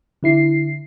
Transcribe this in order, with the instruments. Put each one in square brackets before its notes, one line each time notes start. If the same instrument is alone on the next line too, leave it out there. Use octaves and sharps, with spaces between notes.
[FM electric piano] D3 E4 C7